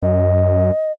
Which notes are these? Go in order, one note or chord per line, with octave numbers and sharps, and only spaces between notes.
F#2 D#5